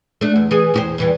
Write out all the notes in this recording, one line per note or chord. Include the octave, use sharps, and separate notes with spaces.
A3 D4
E2
E3 G#4
E2 G4 C5
E2 E3 G3